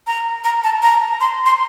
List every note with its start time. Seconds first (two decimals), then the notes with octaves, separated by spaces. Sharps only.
0.07 A#5
0.44 A#5
0.64 A5
0.83 A#5
1.21 C6
1.46 C6